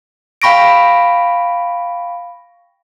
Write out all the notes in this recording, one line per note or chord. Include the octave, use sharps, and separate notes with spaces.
F5 G5 B5 C#6 A#6 D7